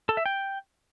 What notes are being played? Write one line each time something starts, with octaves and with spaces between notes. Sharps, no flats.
A4
E5
G5